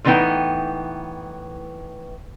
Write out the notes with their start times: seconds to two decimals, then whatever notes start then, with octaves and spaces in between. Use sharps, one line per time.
0.04 A2 C3 E3 B3 D#4 G5